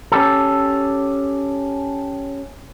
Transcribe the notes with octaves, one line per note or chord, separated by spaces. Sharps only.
C#4 G4 A4